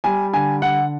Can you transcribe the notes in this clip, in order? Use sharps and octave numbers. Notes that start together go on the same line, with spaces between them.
G3 G#5
D3 G#5
D3 F#5